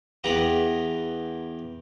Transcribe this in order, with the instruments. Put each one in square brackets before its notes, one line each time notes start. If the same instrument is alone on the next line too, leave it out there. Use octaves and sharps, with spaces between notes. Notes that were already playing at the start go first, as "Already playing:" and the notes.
[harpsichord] E2 B3 G4 F#5 A#5